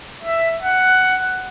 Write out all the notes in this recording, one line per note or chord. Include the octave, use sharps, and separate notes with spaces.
E5
F#5